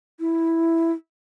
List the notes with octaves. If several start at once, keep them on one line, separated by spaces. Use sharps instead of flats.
E4